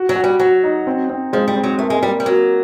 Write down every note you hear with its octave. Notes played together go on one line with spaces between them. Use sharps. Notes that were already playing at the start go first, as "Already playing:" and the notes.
Already playing: F#4
F#3
F#4
G3
F#3 F#4
D#4
C4
C4
F3 G#3
G3
C4
F#3
A3 A#3
G#3
G3 A#3
G3
F#3 A#3